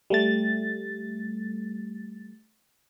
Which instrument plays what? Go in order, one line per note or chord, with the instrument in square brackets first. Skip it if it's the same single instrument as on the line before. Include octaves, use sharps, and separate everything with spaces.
[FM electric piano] G3 A3 A6